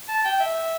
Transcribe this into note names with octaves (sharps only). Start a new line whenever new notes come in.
A5
G5
E5